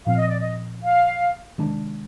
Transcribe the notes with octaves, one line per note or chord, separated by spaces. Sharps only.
A#2 F3 C4 F5
D#5
D5
D#5
F5
C3 D#3 G#3 D4